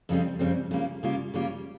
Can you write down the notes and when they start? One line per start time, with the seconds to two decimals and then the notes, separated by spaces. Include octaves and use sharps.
0.09 F2 C#3 G3 C4
0.39 F2 C#3 G3 C4
0.71 C#3 G3 A#3 F4
1.03 C#3 G3 A#3 F4
1.34 C#3 G3 A#3 F4